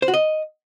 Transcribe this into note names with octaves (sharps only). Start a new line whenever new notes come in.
C5
F#4
D#5